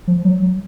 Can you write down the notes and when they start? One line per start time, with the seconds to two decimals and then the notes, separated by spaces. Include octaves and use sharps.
0.07 F3
0.25 F#3
0.42 F#3